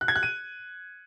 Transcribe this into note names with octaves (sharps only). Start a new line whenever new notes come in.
F#6
G#6
F#6
D#7